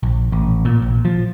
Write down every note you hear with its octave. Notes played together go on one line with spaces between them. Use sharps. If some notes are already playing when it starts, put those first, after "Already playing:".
A#1
A1
A#2
A#1
F3